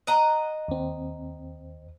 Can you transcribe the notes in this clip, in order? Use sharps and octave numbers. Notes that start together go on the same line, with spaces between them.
D#5 F#5 A#5
D#2 C4